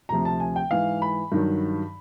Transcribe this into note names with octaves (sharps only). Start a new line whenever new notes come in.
D2 C3 F3 A#5
A5
G#5
G5
G#2 E3 F5
B5
G2 D#3 F#3